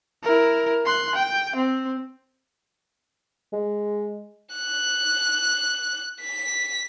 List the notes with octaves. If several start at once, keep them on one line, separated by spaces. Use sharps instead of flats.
E4 A#4
C6 F#6
G5
C4
G#3
F#6
B6